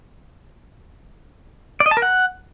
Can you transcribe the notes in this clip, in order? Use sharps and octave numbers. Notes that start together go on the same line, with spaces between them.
D5
D#5
A5
A#4
F#5